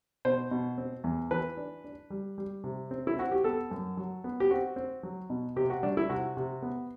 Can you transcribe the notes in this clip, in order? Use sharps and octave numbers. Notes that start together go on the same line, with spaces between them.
B2 C5
B2
C4
E2
E3 B4
D4
D4
G3
G3
C3
C4
E4
C4 F#4
G4
B3 A4
F#2
F#3
B3
G4
C4 F#4
C4
F#3
B2
C3 G4
F#4
G3 D4
E4
C3 F#4
C3
B3